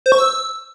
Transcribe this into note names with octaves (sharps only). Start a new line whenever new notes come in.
C5
C#6
E6